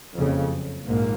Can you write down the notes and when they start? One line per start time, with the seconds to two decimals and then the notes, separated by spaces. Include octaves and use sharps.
0.17 F#1 F2 C#3
0.84 A#1 G#2 A#3